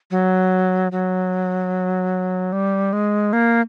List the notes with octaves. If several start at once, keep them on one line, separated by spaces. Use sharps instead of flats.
F#3
F#3
G3
G#3
A#3